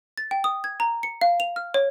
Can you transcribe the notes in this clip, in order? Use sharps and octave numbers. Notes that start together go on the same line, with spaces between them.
A6
G5
D#6
G#6
A#5
C#7
F5
F7
F6
C#5